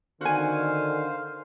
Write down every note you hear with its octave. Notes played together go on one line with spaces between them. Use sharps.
D3 D#3 F#4 C5 F5 G#5